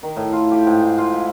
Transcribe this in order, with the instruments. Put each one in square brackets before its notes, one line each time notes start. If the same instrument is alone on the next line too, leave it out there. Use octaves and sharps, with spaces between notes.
[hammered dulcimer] D#3
A2
F4
G4
G#2
G#2
F4
E4